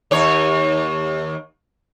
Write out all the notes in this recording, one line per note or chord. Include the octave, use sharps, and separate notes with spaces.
D#2 C#5